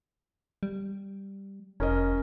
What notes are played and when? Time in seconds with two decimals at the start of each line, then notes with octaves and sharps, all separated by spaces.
0.63 G3
1.80 F1 C#4 A#4 D#5